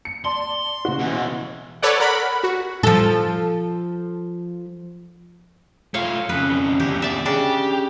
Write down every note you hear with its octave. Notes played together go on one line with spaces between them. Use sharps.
C#7
D5 A5 C6
C#3 F#4
B2 E3
A4 B4 C#5 D5 F#5
A#4 F#5 B5
F#4
F3 A4
A3 F4 C#5 F5
F2 C#3 B4
E2 D3 G4
D5 E5
C#3 D4 G4